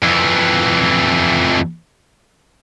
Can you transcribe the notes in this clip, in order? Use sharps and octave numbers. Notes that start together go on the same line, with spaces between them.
F2 E3